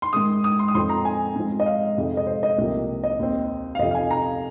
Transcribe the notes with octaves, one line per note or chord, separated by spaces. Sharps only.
C6
G#2 D#3 G#3 D#6
D#6
C6
D#6
F2 F3 C4 C6
A#5
G#5
G#2 F3 C4
D#5
F5
F2 C3 G#3 D#4
D#5
C5
D#5
C2 C3 F3 A#3
D#5
D#2 D#3 C4
F5
F2 C3 F3 D#5
F5
G#5
A#5